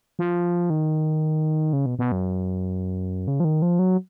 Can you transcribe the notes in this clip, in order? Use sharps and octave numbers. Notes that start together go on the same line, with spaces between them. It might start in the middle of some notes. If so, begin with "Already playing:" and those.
F3
D#3
C#3
B2
B2
F#2
C#3
F3
D#3
F3
F#3